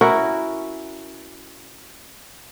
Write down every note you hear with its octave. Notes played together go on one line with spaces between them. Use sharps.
C#4 E4 F#4 A#4